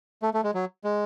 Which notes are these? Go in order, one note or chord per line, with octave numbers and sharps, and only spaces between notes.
A3
A3
G#3
F#3
G#3